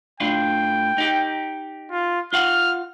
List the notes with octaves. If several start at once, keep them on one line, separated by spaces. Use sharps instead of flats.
A2 D4 F4 G5
D#4 G4
F4
F4 F5 F#5 F6